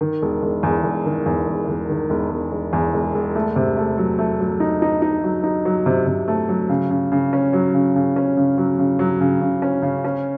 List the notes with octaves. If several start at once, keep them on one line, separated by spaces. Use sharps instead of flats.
D#3
E1
E1
E2
E1
D#3
E2
E1
E1
D#3
E1
E1
E1
E2
E1
E1
A3
C3
A3
F#3
A3
F#3
D#4
D#4
D#4
F#3
D#4
F#3
C3
C3
A3
F#3
C#3
C#3
C#3
C#4
F#3
C#3
C#3
C#4
C#3
F#3
C#3
F#3
C#3
C#3
C#4
C#3
C#4